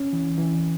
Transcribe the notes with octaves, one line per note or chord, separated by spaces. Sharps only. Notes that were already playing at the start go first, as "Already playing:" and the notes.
Already playing: C#4
E3
E3